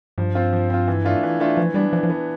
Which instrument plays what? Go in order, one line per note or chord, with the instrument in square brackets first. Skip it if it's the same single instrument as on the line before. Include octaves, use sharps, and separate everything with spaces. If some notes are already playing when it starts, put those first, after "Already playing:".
[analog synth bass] G2 [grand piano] F3
[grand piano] C4 F4
F3
C4 F4
E3
A3 D4 F4
E3
A3 D4 F4
[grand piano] E3 [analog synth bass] F3
[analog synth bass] G3 [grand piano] B3 D4
[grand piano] E3 [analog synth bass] F3
[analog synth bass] F3
[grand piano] B3 D4